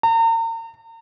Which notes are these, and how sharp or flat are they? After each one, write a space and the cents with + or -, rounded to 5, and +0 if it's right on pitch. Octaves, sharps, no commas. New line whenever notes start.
A#5 -40